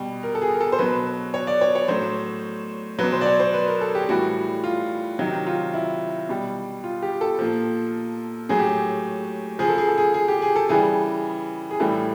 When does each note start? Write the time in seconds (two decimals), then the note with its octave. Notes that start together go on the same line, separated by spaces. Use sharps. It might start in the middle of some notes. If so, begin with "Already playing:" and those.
Already playing: B2 G3
0.23 A#4
0.35 A4
0.42 G#4
0.54 A#4
0.60 A4
0.72 C5
0.79 B2 F#3 B4
1.34 C#5
1.47 D5
1.61 C#5
1.75 C#5
1.88 A2 F#3 C5
2.99 F#3 B4
3.03 B2
3.13 C5
3.21 D5
3.26 C#5
3.40 C5
3.54 B4
3.68 A#4
3.81 A4
3.95 G4
4.09 A2 E3 G3 F#4
4.64 F4
5.19 C3 D#3 F#3
5.47 F4
5.74 E4
6.29 B2 G3
6.84 F4
7.02 G4
7.21 A4
7.39 A#2 F3
8.49 A2 F#3 G#4
8.59 G4
8.68 G#4
9.59 C#3 F3 G#4
9.69 A4
9.78 G#4
9.88 A4
9.98 G#4
10.14 G#4
10.28 G4
10.42 G#4
10.56 A4
10.69 C#3 E3 G3 G#4
11.71 G#4
11.80 A2 E3 G3 A4